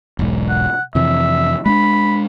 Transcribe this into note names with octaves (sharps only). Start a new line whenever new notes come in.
E1 B1 G#2
F#5
F2 C3 E3 E5
G#3 C4 D4 B5